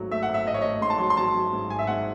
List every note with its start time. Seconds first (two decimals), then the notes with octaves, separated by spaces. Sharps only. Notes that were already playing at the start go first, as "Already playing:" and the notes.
Already playing: G#1 G#2 F#3 A3
0.11 A3 E5
0.23 F#5
0.29 G#1
0.34 E5
0.46 G#1 D#5
0.54 C#5
0.62 A3 D#5
0.81 G#2 C6
0.90 A5
0.98 F#3 C6
1.10 C6
1.16 F#3 A5
1.35 F#3
1.53 G#2
1.70 G#1 G#5
1.79 E5
1.87 G#2 F#5